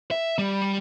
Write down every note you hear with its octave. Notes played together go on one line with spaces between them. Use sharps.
E5
G3